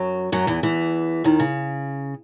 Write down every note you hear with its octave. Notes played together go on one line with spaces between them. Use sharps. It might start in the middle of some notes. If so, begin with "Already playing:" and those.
Already playing: F#2 F#3
F#2 F#3
E2 E3
E2 E3
D#2 D#3
C#3